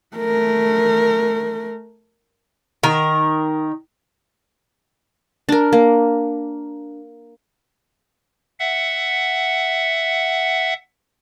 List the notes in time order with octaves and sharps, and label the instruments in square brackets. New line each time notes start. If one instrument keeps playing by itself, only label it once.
[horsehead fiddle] A3 A#4
[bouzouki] D#3 A#4
[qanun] D4 A#4
A#3
[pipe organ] E5 F#5